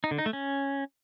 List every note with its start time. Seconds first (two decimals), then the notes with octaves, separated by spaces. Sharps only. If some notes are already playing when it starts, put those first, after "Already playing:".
0.04 D#4
0.11 D3
0.18 D#4
0.26 A3
0.33 C#4